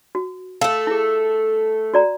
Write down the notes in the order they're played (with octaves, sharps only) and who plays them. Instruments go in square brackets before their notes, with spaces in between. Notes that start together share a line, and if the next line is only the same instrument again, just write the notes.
[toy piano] F#4
[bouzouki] A3 A4 [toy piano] F5
[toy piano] E4 G#4
F#4 D5 A#5